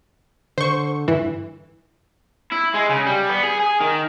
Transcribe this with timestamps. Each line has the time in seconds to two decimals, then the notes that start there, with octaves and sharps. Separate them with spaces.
0.58 D3 C5 C#6
1.08 G2 E3
2.52 E4
2.74 G#3
2.89 C#3
3.06 G3
3.29 B3
3.43 G#4
3.59 G#4
3.81 D#3